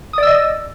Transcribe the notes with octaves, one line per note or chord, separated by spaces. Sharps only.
D5 D#5 D#6 E6